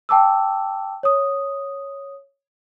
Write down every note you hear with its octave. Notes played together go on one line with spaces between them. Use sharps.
G5 A5 D6 E6
C#5 D#6